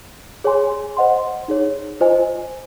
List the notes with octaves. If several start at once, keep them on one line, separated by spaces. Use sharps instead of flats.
G#4 C#5 G#5 C6
C5 D#5 F#5 C6
D#4 G#4 C#5
F4 C5 D#5 G#5